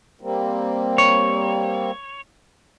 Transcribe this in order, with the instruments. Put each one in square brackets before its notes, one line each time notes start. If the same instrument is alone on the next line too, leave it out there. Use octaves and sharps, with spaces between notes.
[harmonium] G3 A#3 C4
[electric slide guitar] C#5